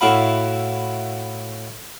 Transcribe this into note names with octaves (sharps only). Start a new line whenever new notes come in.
A2 E4 F#4 F5 B5